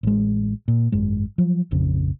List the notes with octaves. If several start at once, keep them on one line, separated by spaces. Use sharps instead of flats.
A1 G#3
A#2
G#1 F#2 G#3
F3 F#3
F1 A#1 F2 C#3